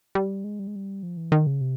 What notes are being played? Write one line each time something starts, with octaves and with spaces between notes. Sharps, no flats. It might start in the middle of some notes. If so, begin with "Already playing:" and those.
G3
G#3
G3
G#3
G3
F3
E3
D#3
C#3
C3